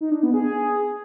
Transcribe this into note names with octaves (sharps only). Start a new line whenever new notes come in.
D#4
D4
B3
G#4